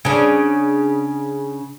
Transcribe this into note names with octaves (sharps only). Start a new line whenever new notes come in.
C#3 D4